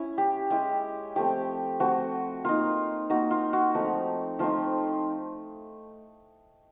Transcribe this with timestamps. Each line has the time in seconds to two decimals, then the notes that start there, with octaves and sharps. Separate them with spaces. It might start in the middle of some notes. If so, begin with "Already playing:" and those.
Already playing: C#4 E4
0.18 G4
0.50 G#3 C#4 E4 G4
1.16 F3 A3 C4 G4
1.80 F3 A3 C4 F#4
2.45 A#3 D#4 F4
3.10 A#3 D#4 F#4
3.31 F4
3.53 F#4
3.74 F3 A3 C4 D#4
4.39 F3 A3 C4 D#4 F4